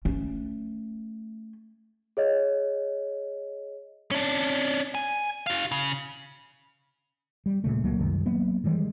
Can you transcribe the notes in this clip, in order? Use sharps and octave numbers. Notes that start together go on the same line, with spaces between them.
A3 C#4
G#4 C#5 D#5
C#4 D4
G#5
F#4 F5
C#3
G3
D#1 A#2 C#3 A3
C#2 F#3 A3 A#3
C2 F#2 D#3
F#3 A#3 B3
D#3 E3 G3 G#3